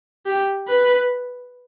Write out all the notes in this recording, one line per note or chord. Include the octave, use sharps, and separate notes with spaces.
G4
B4